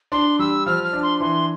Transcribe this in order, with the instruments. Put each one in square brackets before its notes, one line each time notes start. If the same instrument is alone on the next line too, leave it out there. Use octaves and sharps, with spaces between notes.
[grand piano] D4 [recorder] C6
[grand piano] G3 [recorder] E6
[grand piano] F3 [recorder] F6
[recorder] F6
[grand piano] D4
[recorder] C6
[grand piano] E3 [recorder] C6